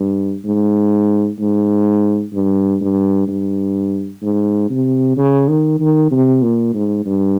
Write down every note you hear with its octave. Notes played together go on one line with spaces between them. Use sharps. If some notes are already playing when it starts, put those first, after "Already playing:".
Already playing: G2
G#2
G#2
G2
G2
G2
G#2
C3
C#3
D#3
D#3
C3
A#2
G#2
G2